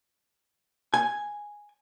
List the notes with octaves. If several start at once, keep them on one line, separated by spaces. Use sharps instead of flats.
G#5